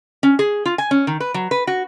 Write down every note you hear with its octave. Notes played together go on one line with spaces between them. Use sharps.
C#4
G#4
F4
G#5
C#4
D#3
B4
F#3
B4
F#4